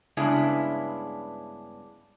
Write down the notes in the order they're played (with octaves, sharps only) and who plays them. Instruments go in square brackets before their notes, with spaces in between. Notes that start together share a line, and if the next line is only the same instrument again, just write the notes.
[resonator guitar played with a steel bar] G2 C#3 G#3 B3 D4 E4